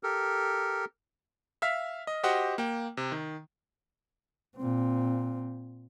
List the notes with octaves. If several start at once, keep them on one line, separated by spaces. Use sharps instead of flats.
G4 A4 A#4
E5 F5 F6 B6
D#5
F#4 G4 C5 D#5 F#5
A#3 G5
C3
D#3
A#2 C4